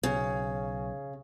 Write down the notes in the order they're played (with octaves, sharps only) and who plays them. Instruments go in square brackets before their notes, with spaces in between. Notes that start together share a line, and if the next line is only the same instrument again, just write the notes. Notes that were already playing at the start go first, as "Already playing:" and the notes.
[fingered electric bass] B1 [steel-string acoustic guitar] C#3